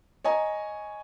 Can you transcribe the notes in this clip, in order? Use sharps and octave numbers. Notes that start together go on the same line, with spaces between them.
C#5 D#5 G#5 A#5